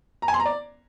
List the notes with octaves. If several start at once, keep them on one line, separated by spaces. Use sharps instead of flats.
A#5
G#5
C6
A#5
D5